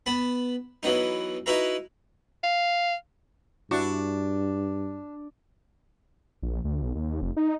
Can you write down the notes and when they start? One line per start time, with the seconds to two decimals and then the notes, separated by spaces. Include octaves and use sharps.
0.06 B3 A5 B5
0.83 E3 F#3 B3 D#4
1.46 D#4 E4 F#4 B4 E5 A#5
2.44 F5
3.71 G2 D4 E4 F#4 C#6
6.42 A#1
6.64 D2
6.82 B1
6.95 D#2
7.22 F1
7.37 D#4